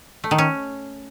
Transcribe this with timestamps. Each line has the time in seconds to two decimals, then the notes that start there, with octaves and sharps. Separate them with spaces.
0.24 A3
0.31 D#3
0.38 C#4